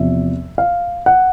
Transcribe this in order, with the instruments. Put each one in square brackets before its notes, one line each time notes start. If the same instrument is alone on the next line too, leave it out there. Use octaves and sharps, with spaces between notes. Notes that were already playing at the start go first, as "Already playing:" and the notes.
Already playing: [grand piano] E2 C3 F3 E5
F5
F#5